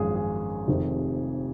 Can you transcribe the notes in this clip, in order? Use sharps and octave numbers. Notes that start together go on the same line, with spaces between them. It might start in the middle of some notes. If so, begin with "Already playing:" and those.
Already playing: G#1 F#2 F3 G#3 G#4
G#4
F1 F2 C3 D#3